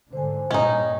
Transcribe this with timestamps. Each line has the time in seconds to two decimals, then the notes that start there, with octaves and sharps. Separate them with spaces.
0.13 G#2 D3 C5 G#5
0.51 G2 A#2 C#4 D#4 D#5